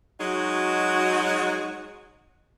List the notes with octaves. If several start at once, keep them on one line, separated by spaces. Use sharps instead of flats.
F#3 G#3 D#4 F#4